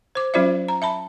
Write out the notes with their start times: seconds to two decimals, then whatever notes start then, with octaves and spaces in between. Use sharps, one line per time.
0.15 C5 D6
0.34 F#3 C#4 F4 C5 D5 E5
0.68 A#5
0.82 E5 A5 B5